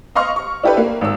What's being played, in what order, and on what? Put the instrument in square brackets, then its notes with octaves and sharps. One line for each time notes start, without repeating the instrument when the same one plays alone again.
[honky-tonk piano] D#5 F5 C6 C#6 F6
C#6
D4 E4 G4 A4 B4
A#3
G#1 E6